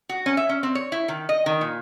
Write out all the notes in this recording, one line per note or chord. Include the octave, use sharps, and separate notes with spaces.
F#4
C#4
E5
C#4
C4
C#5
E4
D#3
D#5
D#3
A#2